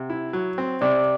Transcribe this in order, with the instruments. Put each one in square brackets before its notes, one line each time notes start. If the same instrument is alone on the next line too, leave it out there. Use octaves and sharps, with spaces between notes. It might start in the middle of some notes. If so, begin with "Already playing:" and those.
Already playing: [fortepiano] C3 [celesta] F#5
[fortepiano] E4
F#3
C4
[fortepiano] C3 [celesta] D5 D6